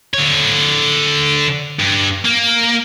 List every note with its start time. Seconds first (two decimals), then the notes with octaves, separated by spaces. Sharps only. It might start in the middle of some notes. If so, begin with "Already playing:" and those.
0.14 D3 C#5
1.79 G2
2.25 A#3